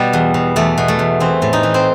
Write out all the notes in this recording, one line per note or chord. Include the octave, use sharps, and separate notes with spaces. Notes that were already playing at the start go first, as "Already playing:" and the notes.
Already playing: B2 G3
E2
B2
E2 A3
B2
A3
E2
E3 C4
A2
D#4
E3
C4